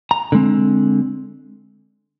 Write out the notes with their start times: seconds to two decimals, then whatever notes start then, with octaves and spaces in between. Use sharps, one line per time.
0.11 A#5
0.32 D3 G#3 C4